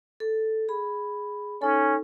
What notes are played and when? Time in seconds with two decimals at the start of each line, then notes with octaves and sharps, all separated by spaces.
0.20 A4
0.69 G#4 B5
1.62 C#4 D#4 A4